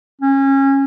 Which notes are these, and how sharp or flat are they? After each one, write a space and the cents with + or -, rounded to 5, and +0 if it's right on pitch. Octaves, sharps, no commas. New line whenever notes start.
C#4 -25